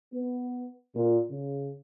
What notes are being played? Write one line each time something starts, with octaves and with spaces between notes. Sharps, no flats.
B3
A#2
C#3